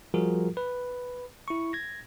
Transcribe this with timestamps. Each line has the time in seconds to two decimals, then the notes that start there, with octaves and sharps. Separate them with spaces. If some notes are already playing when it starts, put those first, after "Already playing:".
0.14 F3 G3 F4 F#4 G#4 A#4
0.57 B4
1.48 E4 C#6
1.73 G#6 A#6